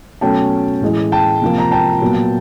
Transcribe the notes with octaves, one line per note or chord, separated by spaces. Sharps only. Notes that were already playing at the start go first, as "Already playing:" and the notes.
B2 F#3 A3 C#4 G5 A5
A2 E3 G#3
G5 A5
C3 F3 A#3
A#5
G5 A5
A#2 F#3 B3